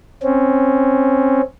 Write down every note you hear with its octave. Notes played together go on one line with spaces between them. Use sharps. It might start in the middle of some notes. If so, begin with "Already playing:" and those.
C4 C#4